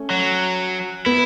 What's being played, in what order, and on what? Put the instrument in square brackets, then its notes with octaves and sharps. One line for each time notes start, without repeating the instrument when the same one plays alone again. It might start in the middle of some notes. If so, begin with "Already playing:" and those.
Already playing: [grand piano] A3 C#4
[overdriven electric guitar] F#3
[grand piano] B3 [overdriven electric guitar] E4